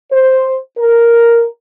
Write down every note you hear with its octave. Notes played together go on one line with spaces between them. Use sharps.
C5
A#4